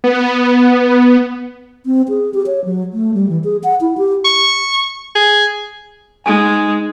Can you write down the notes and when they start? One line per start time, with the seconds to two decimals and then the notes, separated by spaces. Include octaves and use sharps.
0.04 B3
1.86 C4
2.09 G#4
2.34 G4
2.47 C#5
2.65 F#3
2.93 A3
3.14 G3
3.29 E3
3.44 G#4
3.64 F#5
3.81 E4
3.98 G4
4.25 C#6
5.15 G#4
6.26 G#3 D#4 G#5